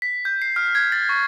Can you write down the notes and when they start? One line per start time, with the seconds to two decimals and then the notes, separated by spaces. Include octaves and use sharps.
0.02 B6
0.25 G6
0.42 C7
0.56 F6
0.75 G#6
0.92 A6
1.09 C#6